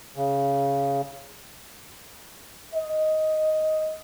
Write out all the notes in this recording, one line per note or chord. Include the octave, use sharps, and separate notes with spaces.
C#3
D#5